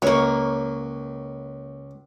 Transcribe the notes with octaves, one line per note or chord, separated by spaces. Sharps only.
C#2 A#3 C#5